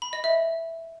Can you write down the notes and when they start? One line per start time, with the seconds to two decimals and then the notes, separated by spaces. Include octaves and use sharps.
0.02 B5
0.13 D#5
0.24 E5